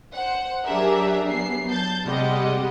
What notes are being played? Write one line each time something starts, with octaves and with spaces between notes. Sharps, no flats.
C5 F#5
F#3 D4 G4 G#4 A#4 E5
F#3 B3 C7
A5 G6 A6
C3 G3 G#3 D#5 F#5